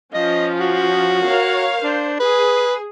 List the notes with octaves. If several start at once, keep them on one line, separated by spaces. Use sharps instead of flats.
F3 C#4 F4 D#5
F#4
A#4 C#5 F5
D4 C5
G#4 B4